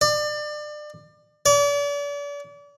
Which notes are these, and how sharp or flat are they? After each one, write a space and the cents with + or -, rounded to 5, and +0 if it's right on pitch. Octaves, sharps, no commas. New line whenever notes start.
D5 +30
D5 -40